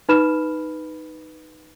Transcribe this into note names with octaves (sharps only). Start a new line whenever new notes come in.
D#4 B4 B5 F6 E7